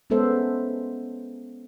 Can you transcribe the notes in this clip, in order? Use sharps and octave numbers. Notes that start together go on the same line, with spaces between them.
G#3 B3 C#4 A4 C5 E5